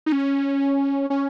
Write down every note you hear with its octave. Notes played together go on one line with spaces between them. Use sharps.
D#4
C#4
C#4